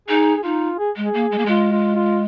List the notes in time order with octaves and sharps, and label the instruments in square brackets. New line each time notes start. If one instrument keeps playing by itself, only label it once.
[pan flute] D#4 [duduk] G#4
[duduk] G#4
[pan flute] D#4 [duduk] F4
[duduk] G#4
[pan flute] G#3
[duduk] G#4
[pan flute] A#3
G#3
A#3
[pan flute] G#3 [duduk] F4
[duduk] F4
F4